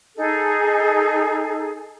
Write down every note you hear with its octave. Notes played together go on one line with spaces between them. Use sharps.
D#4 G#4 A4